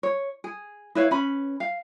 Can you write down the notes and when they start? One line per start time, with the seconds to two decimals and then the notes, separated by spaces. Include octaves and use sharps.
0.03 C#5
0.44 G#4
0.95 E4 B4 C#5 F5
1.11 C#4 B4 B5
1.60 F5